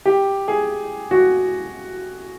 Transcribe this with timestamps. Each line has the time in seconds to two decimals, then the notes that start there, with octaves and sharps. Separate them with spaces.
0.06 G4
0.48 G#4
1.11 F#4